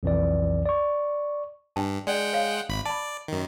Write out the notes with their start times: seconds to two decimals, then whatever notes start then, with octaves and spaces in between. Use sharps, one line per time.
0.03 B1 F2 E3 D5
0.65 D5 C#6
1.76 G2 D4 G5 A5
2.07 G#3 D5 F#5 G5
2.33 C#5 F5
2.69 G#1 B5
2.85 D5 A5 B5
3.28 F#2 D#3